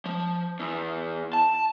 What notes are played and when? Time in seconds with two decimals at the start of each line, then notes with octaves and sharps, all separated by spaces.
0.06 F3
0.60 E2
1.33 A5